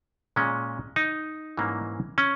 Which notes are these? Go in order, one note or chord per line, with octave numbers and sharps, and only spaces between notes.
A#2 G#3 C#4
D#4
G#2 E3 G3 A#3 C#4
C#4